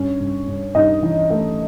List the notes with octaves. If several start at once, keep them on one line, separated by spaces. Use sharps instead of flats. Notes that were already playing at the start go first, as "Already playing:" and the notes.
Already playing: G2 C#4 C#5
G2
G2
G2 D#4 D#5
E3
A3